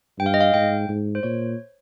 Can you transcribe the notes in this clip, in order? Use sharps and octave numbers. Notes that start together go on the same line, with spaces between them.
G2 G5
F5
D#5
F5
G#2 G5
G#2
C5
A#2 C#5